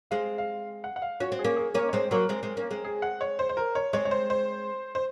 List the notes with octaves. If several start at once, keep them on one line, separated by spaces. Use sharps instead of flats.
G#3 C4 F5
F5
F#5
F#5
F5
C#4 F#4
C4
G#4
A#3 C#4
G#4
A#3 C#4 A#4
C#5
G#3 C4 C5
F#3 A#3 A#4
G#3 C4
G#3 C4
A#3 C#4
G#3 C4
G#4
F#5
C#5
C5
C5
A#4
C#5
G#3 C4 C#5
C#5
C5
C5
C5